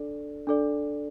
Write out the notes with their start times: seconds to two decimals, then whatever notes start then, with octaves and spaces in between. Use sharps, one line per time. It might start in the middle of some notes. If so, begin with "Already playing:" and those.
Already playing: D4 A4 D5
0.47 D4 A4 D5